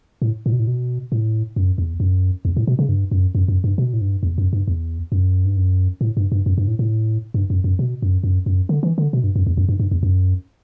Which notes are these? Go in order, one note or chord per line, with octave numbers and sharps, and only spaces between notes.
A2
A2
B2
A2
B2
A2
F#2
E2
F#2
E2
A2
B2
C#3
G2
F#2
F#2
F#2
G2
B2
A2
G2
E2
F#2
G2
E2
F#2
G2
F#2
A2
G2
G2
F#2
G2
A2
A2
G2
F#2
F#2
B2
F#2
F#2
F#2
D3
E3
D3
B2
G2
F#2
E2
F#2
G2
G2
E2
F#2